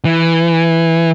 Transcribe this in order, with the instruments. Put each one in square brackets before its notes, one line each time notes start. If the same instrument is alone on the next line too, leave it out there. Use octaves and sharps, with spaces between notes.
[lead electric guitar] E3